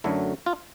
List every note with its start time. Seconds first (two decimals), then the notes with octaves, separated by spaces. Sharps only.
0.04 F#2 D3 F#3 A3 E4
0.46 F4